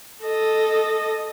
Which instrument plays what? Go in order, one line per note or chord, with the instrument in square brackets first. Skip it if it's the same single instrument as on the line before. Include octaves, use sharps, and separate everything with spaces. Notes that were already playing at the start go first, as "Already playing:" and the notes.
[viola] A4 D#5